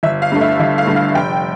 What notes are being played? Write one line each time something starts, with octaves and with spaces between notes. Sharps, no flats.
G1 E5
F5
G2 D3 A3
E5
G1 E5
F5
G2 D3 A3
F5
F1 G5